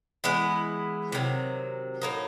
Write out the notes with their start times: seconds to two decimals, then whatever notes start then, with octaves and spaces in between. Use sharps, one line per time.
0.24 E3 G#3 B3 E4
1.12 C3 D#3 F#3
2.02 A2 F#3 A#3 D#4